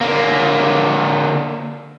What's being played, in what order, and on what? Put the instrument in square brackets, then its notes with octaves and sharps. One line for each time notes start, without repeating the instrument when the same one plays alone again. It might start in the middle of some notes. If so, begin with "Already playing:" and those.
[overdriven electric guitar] D3 A#3